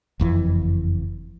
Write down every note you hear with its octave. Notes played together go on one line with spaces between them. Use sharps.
F#1 F2 E3